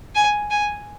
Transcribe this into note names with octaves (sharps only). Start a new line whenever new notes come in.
G#5
G#5